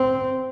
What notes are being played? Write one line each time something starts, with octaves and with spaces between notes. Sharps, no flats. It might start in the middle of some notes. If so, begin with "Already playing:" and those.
Already playing: C4